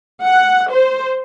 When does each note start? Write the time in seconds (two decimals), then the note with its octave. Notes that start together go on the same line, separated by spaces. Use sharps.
0.23 F#5
0.72 C5